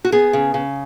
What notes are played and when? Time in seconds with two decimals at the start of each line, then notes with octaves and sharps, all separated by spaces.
0.04 F#4
0.12 B3 G#4
0.33 C#3
0.54 C#3